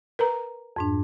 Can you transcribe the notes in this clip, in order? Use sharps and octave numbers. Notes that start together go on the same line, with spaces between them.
A#4 B4 A#5
F2 G#2 D4